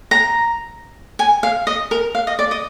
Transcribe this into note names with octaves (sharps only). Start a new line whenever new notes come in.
A#5
G#5
F5
D#5
A#4
F5
D#5
D5
D#5